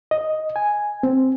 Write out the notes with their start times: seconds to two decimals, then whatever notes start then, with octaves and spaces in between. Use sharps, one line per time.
0.11 D#5
0.56 G#5
1.03 C4